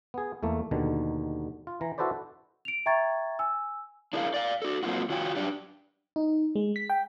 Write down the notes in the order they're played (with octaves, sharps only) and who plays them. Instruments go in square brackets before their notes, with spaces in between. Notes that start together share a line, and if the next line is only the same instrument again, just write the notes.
[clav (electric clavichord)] B3 G#4
E2 A3 A#3
D#2 B2 D3 D#3
F4
E3 A#5
E4 F#4 A4 B4 C5 D5
[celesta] D7 F7
E5 G5 A#5 C#6 G#6 A6
G#5 E6
[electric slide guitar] D4 E4 G#4 A#4 D5 F5
D5 F5
F#4 A4
F#3 A#3 C4 F4 F#4
D#3 F4 F#4 C#5 G5 G#5
F#2 D4 G4
[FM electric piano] D#4
G#3
B6
G5